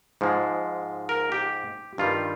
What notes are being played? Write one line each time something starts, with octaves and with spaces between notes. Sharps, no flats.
G#2 F3 G#3
A#4
G4
G2 D#3 G3 F4